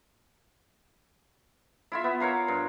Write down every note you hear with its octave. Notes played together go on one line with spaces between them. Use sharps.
E4 F4 E5
B3
A#4 C#5 F5 A#5
G2